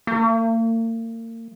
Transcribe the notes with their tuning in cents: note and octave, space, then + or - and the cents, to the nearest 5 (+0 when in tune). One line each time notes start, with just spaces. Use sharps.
A#3 -40